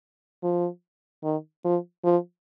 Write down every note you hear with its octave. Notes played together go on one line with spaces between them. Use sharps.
F3
D#3
F3
F3